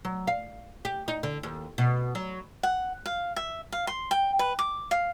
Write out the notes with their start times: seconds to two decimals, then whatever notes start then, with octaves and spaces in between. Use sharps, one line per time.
0.05 F#3
0.27 F5
0.85 G4
1.08 D#4
1.23 D3
1.43 D#2
1.78 B2
2.15 F#3
2.63 F#5
3.06 F5
3.36 E5
3.72 F5
3.87 C6
4.11 G5
4.39 B4
4.59 D6
4.91 F5